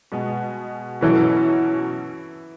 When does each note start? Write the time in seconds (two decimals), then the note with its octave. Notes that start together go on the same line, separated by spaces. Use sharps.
0.12 B2 G#3 B3
1.01 B2 E3 F#3 C#4 E4 A4